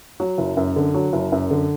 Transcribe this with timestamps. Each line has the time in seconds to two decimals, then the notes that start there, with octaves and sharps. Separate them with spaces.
0.20 F#3
0.38 F#1
0.57 F#2
0.76 D3
0.94 F#3
1.13 F#1
1.32 F#2
1.51 D3